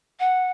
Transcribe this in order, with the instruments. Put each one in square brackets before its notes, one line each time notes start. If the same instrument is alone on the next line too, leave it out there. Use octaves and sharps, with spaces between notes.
[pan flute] F#5